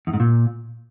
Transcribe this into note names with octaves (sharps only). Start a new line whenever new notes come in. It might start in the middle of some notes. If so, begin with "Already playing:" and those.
E2
G#2
A#2